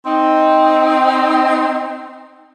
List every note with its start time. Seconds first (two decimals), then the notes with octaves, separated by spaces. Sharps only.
0.06 C4 D#4